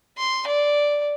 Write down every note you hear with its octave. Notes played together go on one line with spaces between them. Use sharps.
C6
D5